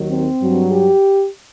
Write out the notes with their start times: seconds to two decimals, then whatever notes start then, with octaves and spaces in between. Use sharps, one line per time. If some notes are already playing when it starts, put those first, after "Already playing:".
Already playing: D#2 D#3 F#3
0.08 C4
0.40 G2 F#3
0.71 G4